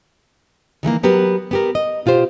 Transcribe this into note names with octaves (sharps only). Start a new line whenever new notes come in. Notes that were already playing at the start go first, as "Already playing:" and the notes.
D#3 E3 A3 A#3
F#3 B3 G4 A#4 B4
B3 G4 A#4
D#5
B2 F4 G4 C5